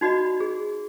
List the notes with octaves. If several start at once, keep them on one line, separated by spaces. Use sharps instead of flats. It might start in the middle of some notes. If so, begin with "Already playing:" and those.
D#4 F#4 D5 D#5 B5
G#4